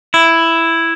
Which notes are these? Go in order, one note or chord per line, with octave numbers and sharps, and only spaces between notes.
E4